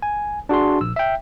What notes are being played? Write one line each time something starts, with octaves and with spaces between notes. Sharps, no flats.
G#5
D4 F#4 G#4 C6
A#1 E6
E5 G5